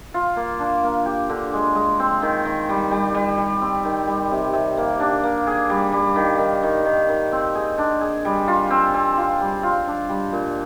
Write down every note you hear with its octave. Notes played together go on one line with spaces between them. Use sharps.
F4
A#3
D4
A#3
G4
D3
G#3
G#3
C4
D#3
D#3
G3
G3
G3
G3
C4
D#3
G3
C3
C3
A#3
D4
A#3
G#4
G3
G3
D#3
D#3
D#3
D#3
D#3
C4
G#4
D4
G#4
G3
F4
C4
C4
F4
G3
F4
D4
G3
A#2